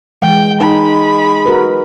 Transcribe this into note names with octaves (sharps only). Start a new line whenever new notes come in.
E3 G#3 G5
G#3 D#4 B5
F#4 A#4 B4